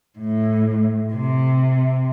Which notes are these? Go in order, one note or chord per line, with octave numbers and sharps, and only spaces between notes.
A2
C3